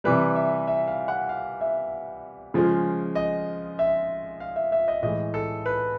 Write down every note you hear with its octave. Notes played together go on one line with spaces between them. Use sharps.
C3 E3 G3 B4
E5
E5
F5
F#5
F5
E5
C#3 F3 G#3
D#5
E5
F5
E5
E5
D#5
A2 E3 G#3 D#5
A4
B4